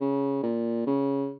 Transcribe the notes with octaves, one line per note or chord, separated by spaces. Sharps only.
C#3
A#2
C#3